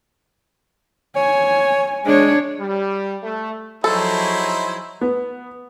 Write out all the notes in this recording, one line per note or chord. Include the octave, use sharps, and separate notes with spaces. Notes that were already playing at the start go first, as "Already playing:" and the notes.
C#5 G#5
G#3 D4 C#5
G3
A3
F3 F#3 D#4 E4 G#4 A4 C5
B3